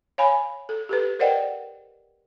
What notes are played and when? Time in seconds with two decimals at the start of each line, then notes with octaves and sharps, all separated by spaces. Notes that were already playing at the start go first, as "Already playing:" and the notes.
0.18 C#5 F5 G#5 B5
0.69 A4
0.89 G4 A4 B4
1.19 A#4 C5 D5 D#5 F#5 G5